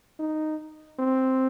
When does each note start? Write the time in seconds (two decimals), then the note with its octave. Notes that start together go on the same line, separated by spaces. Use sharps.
0.20 D#4
1.00 C4